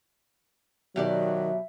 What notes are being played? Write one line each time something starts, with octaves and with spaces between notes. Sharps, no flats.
B2 D#3 F#3 G4 D5 E5